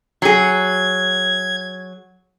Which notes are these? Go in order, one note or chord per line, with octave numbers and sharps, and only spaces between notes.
F#3 G#4 G#6